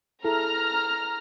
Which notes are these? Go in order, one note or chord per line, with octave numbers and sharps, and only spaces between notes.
E4 G#4 A4 A#5 F6